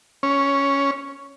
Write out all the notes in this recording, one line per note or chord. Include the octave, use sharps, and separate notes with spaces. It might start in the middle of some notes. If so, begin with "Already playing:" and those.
C#4